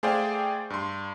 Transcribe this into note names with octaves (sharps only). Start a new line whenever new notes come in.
A3 G#4 C5 D5 F5 G5
G2 C6